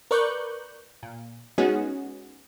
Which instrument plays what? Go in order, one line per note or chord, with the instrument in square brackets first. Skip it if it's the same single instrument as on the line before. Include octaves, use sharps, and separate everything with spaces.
[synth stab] A#4 B4 D5 C#6 F#6 G6
A#2
G#3 B3 C#4 D#4 F#4 G#4